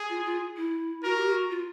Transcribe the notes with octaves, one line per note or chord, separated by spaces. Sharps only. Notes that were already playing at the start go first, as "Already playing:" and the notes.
Already playing: G#4
F4
F4
E4
F#4 A#4
G4
F#4
F4